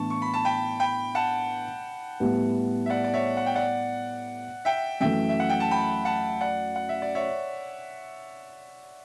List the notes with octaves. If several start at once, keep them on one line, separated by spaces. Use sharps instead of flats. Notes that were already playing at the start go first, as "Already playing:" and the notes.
Already playing: A2 E3 B3 D4 A5 C#6
C#6
B5
A5
G5 B5
G5 B5
F#5 A5
A2 G3 B3
E5
D5 F#5
D5
C#5 E5
F#5
G5
D5 F#5
E5 G5
F#2 E3 A3 E5 G5
E5
F#5
G5
A5
G5 B5
F#5 A5
D5 F#5
F#5
E5
D5
C#5 E5